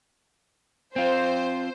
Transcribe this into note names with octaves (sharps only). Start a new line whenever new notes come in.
C4 F4 C5